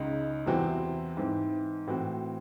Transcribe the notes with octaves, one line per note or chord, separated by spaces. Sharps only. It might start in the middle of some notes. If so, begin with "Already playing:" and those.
Already playing: C#2 C#3 G#3 D#4
E2 C3 E3 C4 F#4
G#2 E3 C4
A2 E3 C4 F#4